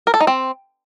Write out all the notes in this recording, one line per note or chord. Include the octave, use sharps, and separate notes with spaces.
A#4
A4
D#4
C4